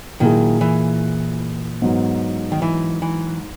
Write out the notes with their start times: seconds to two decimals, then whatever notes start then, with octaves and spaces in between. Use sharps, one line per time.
0.20 A#2 D#3 F#3 A#3 E4 G#4
0.61 E3
1.82 G#2 F#3 B3
2.52 D#3
2.62 E3
3.02 E3